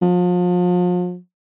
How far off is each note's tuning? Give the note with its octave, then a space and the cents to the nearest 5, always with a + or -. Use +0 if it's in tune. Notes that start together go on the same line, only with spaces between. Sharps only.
F3 +35